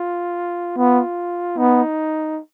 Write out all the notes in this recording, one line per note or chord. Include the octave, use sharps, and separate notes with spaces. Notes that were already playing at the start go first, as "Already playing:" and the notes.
Already playing: F4
B3 F4
B3 D#4